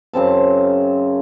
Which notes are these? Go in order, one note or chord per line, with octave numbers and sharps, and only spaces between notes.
F#2 C#3 C4 A5